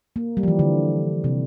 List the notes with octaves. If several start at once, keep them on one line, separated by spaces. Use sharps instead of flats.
A#3
G3
F3
E3
D3
C3